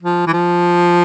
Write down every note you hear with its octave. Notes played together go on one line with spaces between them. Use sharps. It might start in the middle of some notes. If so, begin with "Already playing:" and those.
F3
E3
F3